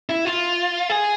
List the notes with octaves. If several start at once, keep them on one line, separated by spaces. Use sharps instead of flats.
E4
F4
G#4